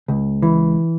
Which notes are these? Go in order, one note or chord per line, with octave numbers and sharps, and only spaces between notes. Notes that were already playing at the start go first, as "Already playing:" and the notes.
C#2
E3